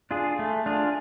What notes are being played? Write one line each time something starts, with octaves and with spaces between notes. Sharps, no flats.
D4 F4 G#4
A3
D4 F4 G#4